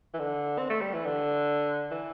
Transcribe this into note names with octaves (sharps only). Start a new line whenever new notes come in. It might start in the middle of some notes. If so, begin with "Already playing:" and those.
E3
D3
C4
A3
G3
E3
D3
E3